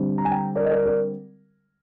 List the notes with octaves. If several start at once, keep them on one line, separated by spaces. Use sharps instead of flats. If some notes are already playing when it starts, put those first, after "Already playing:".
Already playing: D3 G3 C4
A#5
G#5
G5 A#5
A#4 D5
D#5
A#4 D5
A#4 D5